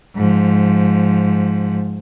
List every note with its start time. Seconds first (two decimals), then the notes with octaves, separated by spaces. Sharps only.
0.16 G#2 F3